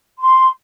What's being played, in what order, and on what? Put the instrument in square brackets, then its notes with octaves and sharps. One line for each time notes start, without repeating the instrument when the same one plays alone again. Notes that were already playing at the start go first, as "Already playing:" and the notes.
[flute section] C6